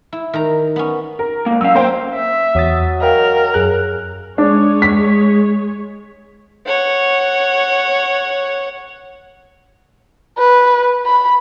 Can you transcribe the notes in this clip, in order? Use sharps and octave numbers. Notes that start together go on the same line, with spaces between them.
E4
D#3 A#5
B3 C#4
A#4
D2 A#3
F#3 C#4 F5 E6
A#3 C5 G5
E5
E2 F#3 D#6 A6
A#4 D#5 F5 G5
F#2 G#4 F#6
G#3 D4 C#5
B6
C#5 F#5
B4
B5